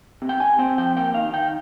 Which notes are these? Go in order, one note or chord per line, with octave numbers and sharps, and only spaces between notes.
C3
G5
C3 G#5
C4 G5
F3 G5
A#3 G5
D#3 F5
D#3 G5